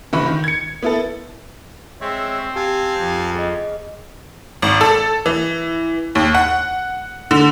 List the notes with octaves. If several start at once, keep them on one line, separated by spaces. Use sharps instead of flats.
F#1 E3 B5 C#6
D#3
G#6 C#7
B3 E4 A4
G#3 C4 C#5 E5
G4 F5 G#5 A5
F2
G#4 D#5
G#1
A4
E3
D#2
F#5
D3